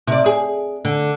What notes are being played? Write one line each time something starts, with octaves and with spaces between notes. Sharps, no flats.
C3 D5
G#4
D3